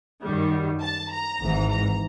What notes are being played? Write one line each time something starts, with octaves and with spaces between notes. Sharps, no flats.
F#2 D#3 G3
A5
A#5
G#1 G#2 E3
A#5